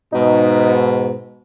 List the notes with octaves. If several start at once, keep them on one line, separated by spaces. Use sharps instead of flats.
G#2 B2 D#4